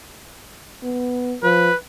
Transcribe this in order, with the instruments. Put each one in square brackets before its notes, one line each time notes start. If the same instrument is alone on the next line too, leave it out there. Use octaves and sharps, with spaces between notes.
[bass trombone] B3
[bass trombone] F3 [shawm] B4